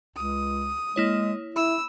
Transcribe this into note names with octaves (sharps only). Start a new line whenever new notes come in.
C#2 D#6
G#3 A#3 E4 C#5
E4 B5 E6